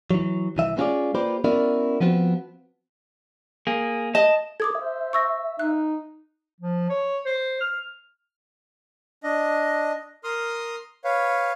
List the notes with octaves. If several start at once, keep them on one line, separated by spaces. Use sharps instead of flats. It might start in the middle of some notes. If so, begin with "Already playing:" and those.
E3 F#3
C2 E3 E5
G#3 B3 C#4 F4 G#4 D5
A#3 F4 G4 B4 C5 D5
B3 C#4 E4 F#4 A#4 D5
F3 B3 C4 F#4
A#3 G#4
D#5 A5
A4 D6 D#6 G#6
C5 E5
C#6 E6 A#6
D#4 F#6
F3
C#5
C5
F6
D4 D#5
A#4 C6 D#6 F6
B4 C#5 F5